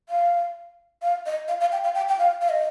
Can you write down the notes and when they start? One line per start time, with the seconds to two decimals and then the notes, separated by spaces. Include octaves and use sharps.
0.09 F5
1.02 F5
1.26 D#5
1.48 F5
1.60 F5
1.72 G5
1.84 F5
1.95 G5
2.09 G5
2.19 F5
2.41 F5
2.49 D#5